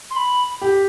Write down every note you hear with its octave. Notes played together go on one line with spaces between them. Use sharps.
C6
B5
G4